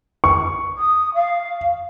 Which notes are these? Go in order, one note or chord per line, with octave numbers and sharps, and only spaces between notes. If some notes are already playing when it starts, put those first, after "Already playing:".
C#6
D#6
F5